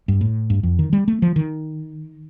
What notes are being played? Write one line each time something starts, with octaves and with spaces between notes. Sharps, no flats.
G2
A2
G2
F2
D#3
G3
A3
F3
D#3